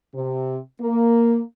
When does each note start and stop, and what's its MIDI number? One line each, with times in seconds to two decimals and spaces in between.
0.15 0.58 48
0.81 1.41 58